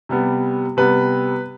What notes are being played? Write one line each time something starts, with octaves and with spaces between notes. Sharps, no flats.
C3 G3 B3
C3 G3 B3 B4